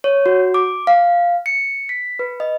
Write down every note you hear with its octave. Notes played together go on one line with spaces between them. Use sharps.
C#5
F#4
D6
F5
C#7
B6
B4
D#5